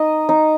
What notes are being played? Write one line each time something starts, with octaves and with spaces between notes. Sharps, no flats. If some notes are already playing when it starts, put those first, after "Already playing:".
Already playing: D#4 D#5
D#4